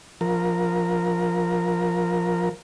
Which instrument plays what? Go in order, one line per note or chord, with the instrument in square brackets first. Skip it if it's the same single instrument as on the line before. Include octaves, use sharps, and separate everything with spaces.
[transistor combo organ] F3 A#4